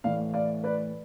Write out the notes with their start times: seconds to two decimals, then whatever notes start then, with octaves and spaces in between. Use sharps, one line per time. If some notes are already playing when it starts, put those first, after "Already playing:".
0.04 A2 E3 D5 F5
0.33 D5 F5
0.63 B4 D5